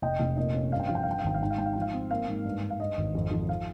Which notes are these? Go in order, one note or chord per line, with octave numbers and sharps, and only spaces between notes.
F1 D#5 G5
F1
A#2 D#5
C#4
G2 F5
G5
F3 F5
G5
F5
G2 G5
F5
G#1 G5
F5
G#2 G5
F5
G#2 G5
F5
F3 G5
F5
C4
A#3 F5
G#2
G2
G2
F5
G2 D#5
G#1
F2
F3
F5